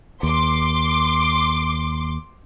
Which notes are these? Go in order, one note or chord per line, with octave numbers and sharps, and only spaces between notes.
D#2 C6 D6